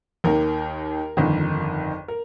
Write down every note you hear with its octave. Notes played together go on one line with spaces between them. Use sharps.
D#2 D#3 A#4
G1 F2 D#3
A#4